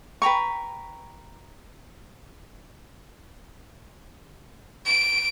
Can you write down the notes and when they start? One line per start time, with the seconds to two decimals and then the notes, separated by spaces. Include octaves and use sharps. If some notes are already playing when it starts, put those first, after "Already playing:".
0.22 B4 G5 A#5 C#6
4.86 D7